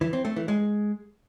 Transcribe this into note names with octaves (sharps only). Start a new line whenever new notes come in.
E3
C4
A3
E3
G#3